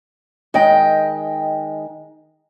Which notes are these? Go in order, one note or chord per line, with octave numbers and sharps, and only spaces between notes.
D#3 G#3 D#5 G5